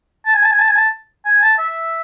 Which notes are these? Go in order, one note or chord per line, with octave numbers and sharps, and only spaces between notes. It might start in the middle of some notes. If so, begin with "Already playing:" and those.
A5
G#5
A5
G#5
A5
G#5
A5
G#5
A5
E5